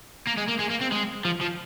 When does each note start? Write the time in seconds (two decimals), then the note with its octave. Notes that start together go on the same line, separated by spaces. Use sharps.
0.27 A#3
0.38 G#3
0.49 A#3
0.60 G#3
0.71 A#3
0.81 C4
0.92 G#3
1.25 F3
1.41 F3